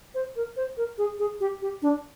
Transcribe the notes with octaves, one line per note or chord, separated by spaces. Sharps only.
C5
A#4
C5
A#4
G#4
G#4
G4
G4
D4